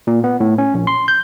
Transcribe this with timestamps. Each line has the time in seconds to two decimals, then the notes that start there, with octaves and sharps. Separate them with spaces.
0.07 A#2
0.24 B3
0.40 A2
0.58 C#4
0.74 A#1
0.87 C6
1.08 G6